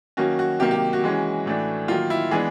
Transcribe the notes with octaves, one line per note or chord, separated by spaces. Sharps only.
D#3 F#3 A#3 C#4 F#4
F#4
C3 D#3 F#3 A#3 G4
G4
F#4
E3 G#3 C#4
A2 E3 A3 D4
D#3 F#3 A#3 F4
E4
E3 G#3 B3 D4 G#4